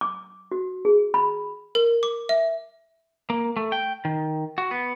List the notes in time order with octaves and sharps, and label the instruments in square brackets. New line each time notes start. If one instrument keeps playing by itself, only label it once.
[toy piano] D6
F#4
G#4
B5
[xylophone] A#4
D6
E5
[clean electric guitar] A#3
A3
G5
D#3
F#4
B3